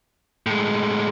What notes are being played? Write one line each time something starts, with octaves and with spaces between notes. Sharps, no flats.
A2 G#3